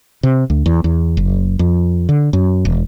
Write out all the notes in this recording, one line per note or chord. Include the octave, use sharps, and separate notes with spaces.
C3
D2
E2
E2
F#1
F2
D3
F#2
E1